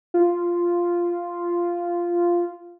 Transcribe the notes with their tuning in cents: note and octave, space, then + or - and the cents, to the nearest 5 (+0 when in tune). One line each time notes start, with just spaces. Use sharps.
F4 -5